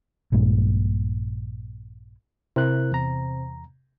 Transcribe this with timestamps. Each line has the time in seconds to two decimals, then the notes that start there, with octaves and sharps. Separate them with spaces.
0.32 A#1 G2 A#2 G#3
2.56 C3 E4 A#4 F#6
2.92 E2 A#5